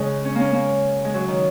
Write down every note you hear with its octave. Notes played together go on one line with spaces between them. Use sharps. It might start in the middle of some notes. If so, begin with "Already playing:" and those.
Already playing: C#3 G#3
C#4
A#3 C#4
A#3
G#3
F#3
D#3